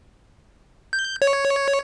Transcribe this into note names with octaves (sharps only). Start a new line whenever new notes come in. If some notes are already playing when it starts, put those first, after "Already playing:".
G6
C#5